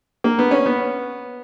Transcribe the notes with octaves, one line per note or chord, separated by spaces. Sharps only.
A#3
B3
C#4
B3